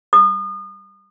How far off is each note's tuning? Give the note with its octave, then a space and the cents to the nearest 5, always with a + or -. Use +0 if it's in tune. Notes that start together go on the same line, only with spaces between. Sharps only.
D#6 -35